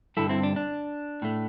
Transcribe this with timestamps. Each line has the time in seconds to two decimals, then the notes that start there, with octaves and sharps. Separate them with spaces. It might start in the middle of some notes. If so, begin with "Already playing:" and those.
0.17 G2 D3 G3 E4 A4
0.29 C4 E4
0.43 D4
0.56 D4
1.22 A2 A3